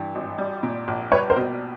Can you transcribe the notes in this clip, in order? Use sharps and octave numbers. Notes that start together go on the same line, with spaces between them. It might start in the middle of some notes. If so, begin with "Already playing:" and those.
Already playing: G2 E3
G#1
G3
A#2
A#1
G3 B4 C#5
A#4 C5
B2